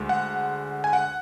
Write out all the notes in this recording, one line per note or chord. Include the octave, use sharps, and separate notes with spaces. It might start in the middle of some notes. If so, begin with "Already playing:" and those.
Already playing: D2 D3 G#3
F#5
G#5
F#5